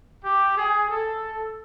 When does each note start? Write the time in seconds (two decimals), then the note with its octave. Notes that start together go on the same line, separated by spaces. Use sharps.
0.24 G4
0.57 G#4
0.90 A4